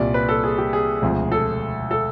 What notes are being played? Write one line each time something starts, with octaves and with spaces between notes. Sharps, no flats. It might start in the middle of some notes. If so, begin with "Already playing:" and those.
Already playing: C2 A#2 G3 D5
B4
A4
G#4
G4
G#4
E1 D2 C3 F3
A4
A4